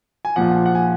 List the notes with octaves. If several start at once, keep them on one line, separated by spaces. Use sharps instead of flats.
G#5
A#1 A#2 F3 F#5
F#5
G#5